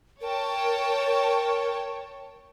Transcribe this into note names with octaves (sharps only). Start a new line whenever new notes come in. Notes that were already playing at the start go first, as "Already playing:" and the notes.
A#4 C#5 G5 A5